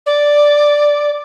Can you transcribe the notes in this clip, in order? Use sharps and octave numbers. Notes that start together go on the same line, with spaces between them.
D5